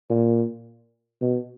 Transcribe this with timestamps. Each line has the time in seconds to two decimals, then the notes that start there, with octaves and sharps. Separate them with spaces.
0.10 A#2
1.21 B2